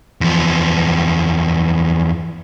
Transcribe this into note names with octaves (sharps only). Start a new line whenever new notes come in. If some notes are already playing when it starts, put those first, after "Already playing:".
E2 F3